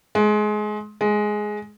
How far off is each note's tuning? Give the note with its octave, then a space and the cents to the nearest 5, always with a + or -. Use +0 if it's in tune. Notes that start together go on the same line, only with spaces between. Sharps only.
G#3 +25
G#3 +10